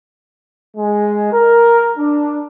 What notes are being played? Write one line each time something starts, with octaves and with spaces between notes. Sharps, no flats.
G#3
A#4
D4